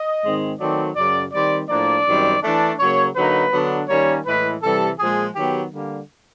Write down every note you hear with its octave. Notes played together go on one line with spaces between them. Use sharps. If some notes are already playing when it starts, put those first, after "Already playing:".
Already playing: D#5
G#2 D#3 G#3 C4
D#3 F#3 A3 C4 D5
F#2 C#3 F#3 D5
D#3 G3 C4 D5
A2 F3 A#3 D4 D5
F#2 D#3 G3 C4
E3 A3 D4
C#3 F#3 A#3 C#5
D3 F#3 A#3 D#4 B4
D3 F#3 B3 D4
D#3 G3 A#3 C#4 C#5
A2 E3 G#3 B4
C3 E3 G3 A4
A#2 F3 G#3 G#4
D#3 F#3 B3 G4
D3 G3 A#3